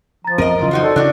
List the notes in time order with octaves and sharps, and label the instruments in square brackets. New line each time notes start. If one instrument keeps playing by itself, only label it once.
[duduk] F3 [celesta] A#5 A6
[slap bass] F2 C4 [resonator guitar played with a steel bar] A#4 D#5 [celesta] D#7
[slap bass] C#3 E3 F#3 [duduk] F4
[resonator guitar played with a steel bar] D#4 F#4 C5
[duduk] A4 [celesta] D5
[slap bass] C#3 [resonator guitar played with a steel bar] D4 F#4 [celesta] E4 C#5 D5